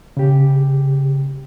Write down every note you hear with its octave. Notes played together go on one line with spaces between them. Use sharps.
C#3 G4